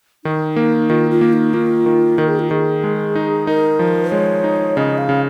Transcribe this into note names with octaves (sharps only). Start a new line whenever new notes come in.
D#3 D#4
A#3
D#3 F4
F4
A#3
D#4
A#3 F4
D#3
D#3 A#4
G#4
F4
D#3 G#4
G#3
D#4
D#4 A#4
F3
G#3 C#5
D#4
C#3 D#5
F5
C#3